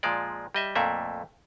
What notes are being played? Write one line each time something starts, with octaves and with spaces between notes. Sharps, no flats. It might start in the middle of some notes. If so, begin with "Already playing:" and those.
A#2 F3 G#3 D5
G3 D#5 E5
F2 A#2 A3 A#3 E5